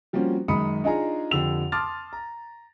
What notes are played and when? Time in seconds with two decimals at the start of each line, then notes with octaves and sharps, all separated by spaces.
0.13 F3 G3 A#3 C4 C#4 F#4
0.48 F#2 D#3 G#3 B5 D#6 C#7
0.84 D4 D#4 F4 G#4 G#5 A#5
1.31 F2 D3 G4 E6 F7
1.72 A5 C6 D6 D#6 F6 A6
2.13 A#5